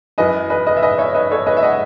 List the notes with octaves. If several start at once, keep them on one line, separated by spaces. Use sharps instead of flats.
F#2 E3 B4 D#5
B4 D#5
B4 D#5
E5
B4 D#5
C#5 E5
B4 D#5
A4 C#5
B4 D#5
E5
D#5 F#5